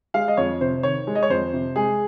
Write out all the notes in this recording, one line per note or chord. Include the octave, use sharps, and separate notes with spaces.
G#3 F5
D#5
F2 C#5
C3 C5
D#3 C#5
G#3
D#5
C#5
F2 C5
C3
G#3 G#4